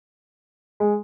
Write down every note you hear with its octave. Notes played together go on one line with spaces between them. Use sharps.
G#3